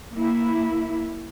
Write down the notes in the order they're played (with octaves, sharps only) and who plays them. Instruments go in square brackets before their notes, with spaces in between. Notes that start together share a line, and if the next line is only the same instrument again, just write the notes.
[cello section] A#3 E4